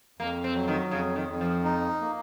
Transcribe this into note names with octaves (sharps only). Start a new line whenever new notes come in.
F2 A#3
C4
F#3
D#3
F2 C#3
D#3
F2
F3
D#4
A#3